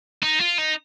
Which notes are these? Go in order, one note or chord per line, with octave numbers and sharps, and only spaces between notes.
D#4
F4
D#4